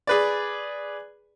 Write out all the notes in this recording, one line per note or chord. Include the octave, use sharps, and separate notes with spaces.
G#4 B4 D5